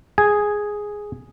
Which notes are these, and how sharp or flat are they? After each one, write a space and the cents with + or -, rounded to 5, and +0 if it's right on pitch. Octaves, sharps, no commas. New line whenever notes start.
G#4 +0 G#5 +0